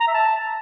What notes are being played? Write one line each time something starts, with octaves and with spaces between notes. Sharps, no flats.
A#5
E5
A5